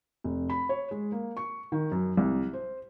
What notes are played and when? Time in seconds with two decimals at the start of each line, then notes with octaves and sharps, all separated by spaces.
0.24 F1
0.50 B5
0.69 C#5
0.91 G#3
1.12 A#3
1.37 C#6
1.72 D#3
1.92 F#2
2.17 C2
2.53 C5